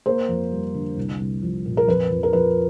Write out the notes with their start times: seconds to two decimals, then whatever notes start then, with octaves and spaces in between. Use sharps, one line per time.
0.06 A#3 A#4 C5
0.29 F2
0.51 G3
0.74 D3
0.97 C2
1.20 C2
1.42 F3
1.66 A#2
1.77 A#4
1.88 F2 B4
2.11 F2
2.23 A#4
2.33 F3 B4